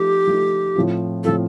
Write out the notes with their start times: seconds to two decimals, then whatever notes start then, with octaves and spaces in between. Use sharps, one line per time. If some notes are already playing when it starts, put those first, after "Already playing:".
Already playing: F3 A3 D#4 G4
0.27 F3 A3 D#4
0.75 A2 F3 C4 F4
1.24 A2 F3 C4 F4 A4